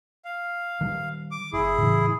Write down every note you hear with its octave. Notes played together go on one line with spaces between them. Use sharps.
F5
D#3 G3
D6
F#1 E4 G#4
A2 C#3 E3